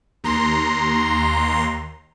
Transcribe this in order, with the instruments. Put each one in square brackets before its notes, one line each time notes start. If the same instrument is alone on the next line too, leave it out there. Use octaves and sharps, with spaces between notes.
[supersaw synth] D#2 A#5 C6